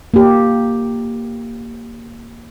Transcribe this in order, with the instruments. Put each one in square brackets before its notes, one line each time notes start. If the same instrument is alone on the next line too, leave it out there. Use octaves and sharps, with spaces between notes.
[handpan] A#3 G4